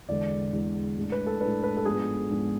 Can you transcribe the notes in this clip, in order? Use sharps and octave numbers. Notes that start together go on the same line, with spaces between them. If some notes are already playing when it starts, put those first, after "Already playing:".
E2 D3 G#3 D5
E2 D3 G#3
A2 G#3 D4
B4
A4
A2 G#3 D4 B4
B4
A4
G#2 F3 B3 D4 G#4
G#2 F3 B3 D4